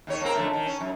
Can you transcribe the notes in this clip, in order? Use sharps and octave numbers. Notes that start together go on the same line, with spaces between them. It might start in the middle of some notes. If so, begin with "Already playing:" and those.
D#2 D#3 C#5
A#3 C4 A#4
F2 D3 A3
D#3
C#4
F#2